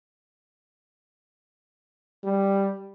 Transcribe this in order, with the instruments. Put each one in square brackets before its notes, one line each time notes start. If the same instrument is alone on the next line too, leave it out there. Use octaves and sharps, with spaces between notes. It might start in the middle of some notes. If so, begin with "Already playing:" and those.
[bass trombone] G3